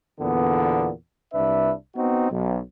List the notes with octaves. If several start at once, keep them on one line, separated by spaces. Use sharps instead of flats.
E2 A#2 D3 B3
C2 D4 B4 E5
B3 C4 D#4 F#4
B1